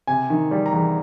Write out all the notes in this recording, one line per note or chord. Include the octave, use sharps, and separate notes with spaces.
C3 G#5
D#3
G3
A#5
E2